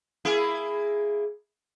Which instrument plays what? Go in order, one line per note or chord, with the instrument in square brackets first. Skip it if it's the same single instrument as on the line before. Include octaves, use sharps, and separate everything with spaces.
[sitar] A#3 E4 G#4